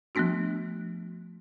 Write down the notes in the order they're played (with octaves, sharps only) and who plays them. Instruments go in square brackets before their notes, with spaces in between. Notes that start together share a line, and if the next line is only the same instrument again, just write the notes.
[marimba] F3 G3 A3 B3 D4 F#4